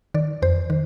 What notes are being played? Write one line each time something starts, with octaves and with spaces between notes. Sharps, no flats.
D#3 D5
F2 C5
D#3